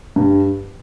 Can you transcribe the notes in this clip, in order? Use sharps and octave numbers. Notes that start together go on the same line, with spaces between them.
G2